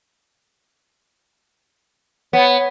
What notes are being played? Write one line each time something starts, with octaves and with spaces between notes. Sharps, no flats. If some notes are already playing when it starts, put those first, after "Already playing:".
B3 C#5